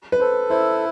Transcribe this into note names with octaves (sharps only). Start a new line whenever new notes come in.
B4
A4 C5
E4 C5